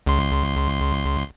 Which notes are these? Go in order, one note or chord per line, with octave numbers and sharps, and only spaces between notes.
C#2 C6